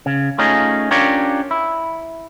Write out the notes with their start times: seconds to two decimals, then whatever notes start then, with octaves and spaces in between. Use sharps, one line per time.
0.06 C#3
0.38 A3 C#4 D#4 F4 G#4
0.91 C#4 D4 F4 G4 A#4 C#5
1.51 E4